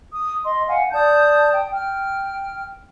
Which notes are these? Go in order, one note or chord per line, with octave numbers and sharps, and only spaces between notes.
D#6
D#5 C6
F5 F#5 G#5
D5 A5 D#6 G6
G5
G5 F6